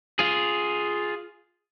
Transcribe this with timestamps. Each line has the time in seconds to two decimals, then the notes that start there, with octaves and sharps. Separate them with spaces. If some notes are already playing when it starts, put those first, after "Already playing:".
0.19 F4 G#4